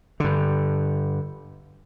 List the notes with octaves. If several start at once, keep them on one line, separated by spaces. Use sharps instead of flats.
G2 D3